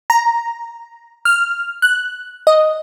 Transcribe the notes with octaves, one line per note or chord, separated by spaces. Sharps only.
A#5
F6
F#6
D#5